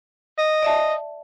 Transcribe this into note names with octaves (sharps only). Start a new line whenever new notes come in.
D#5
D5 E5 A5